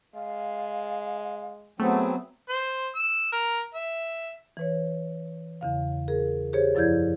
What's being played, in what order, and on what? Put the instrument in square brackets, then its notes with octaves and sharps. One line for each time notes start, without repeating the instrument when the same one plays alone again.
[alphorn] G#3 [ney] F5
[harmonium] F#3 B3 C4 [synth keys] A3 [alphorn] G#4 [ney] G5
[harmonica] C5
E6
A#4
E5
[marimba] E3 B4 C#5
E2 C#3 F5
G#4 A#4
G4 G#4 C5 C#5
F#2 F3 E4 D5 G6 G#6